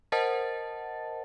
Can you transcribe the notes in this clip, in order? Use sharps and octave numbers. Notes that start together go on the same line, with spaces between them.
A#4 C5 D#5 F#5 A5 A6